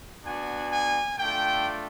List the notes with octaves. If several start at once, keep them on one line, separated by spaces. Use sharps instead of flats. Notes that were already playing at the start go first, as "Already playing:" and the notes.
B3 D4 F#4 G#5
G#5
A3 D4 F4 G5